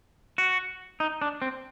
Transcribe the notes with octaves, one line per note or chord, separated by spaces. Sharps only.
F#4
D#4
D4
C4